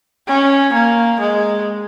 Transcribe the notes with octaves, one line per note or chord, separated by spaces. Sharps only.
C#4
A#3
G#3